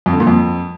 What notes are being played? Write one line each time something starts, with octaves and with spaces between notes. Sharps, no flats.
F2
D3
A#2
F2